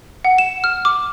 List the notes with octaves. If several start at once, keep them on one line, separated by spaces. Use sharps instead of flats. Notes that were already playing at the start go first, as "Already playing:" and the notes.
F#5
E7
F6
D6